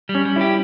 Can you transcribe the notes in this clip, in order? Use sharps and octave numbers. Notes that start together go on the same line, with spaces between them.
G3
C#4
G3
E4 G4